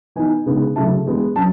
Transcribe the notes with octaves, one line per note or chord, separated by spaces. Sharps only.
E3 B3 D#4 G#5
C#3 G#3 B3 D#4
C#3 F#3 A3 E4 A5
E3 G#3 B3
F#3 C#4 A5